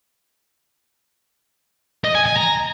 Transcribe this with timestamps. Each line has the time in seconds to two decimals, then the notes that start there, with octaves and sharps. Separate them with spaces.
2.04 D#5
2.15 G#5
2.26 G#5
2.37 A#5